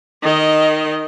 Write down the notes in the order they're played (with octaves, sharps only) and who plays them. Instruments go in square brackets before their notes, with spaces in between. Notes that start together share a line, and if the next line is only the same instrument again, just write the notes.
[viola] D#3 D#5